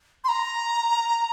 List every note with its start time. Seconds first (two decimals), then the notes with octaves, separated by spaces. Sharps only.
0.24 C6
0.29 A#5